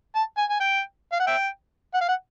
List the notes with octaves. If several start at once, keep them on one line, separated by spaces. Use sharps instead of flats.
A5
G#5
G#5
G5
F5
F#5
E5 G5
F#5
F5
F#5